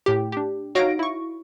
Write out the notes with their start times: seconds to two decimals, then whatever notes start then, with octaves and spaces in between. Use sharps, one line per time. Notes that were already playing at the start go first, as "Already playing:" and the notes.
0.06 A2 G4
0.32 D4 G4
0.75 D#4 F#4 C#5 F5 A#6 D7
0.99 E4 C#6